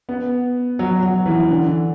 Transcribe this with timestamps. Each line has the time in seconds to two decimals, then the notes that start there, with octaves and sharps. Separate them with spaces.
0.09 B3
0.79 F#3
1.03 F#3
1.26 E3
1.50 D3